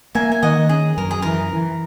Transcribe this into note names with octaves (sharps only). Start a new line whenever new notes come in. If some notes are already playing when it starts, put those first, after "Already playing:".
A#3 E5 G#5
G#5
D#3 D#5 F#5
C#4 G#4
F#2 A#4
G#4
E3 A#4
E3